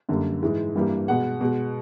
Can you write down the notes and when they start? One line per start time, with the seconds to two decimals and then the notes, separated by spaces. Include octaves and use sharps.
0.09 F#2 D3 G3 A#3
0.42 G#2 E3 G#3
0.75 G2 E3 G3 A#3
1.08 B2 G#3 F#5
1.41 B2 G#3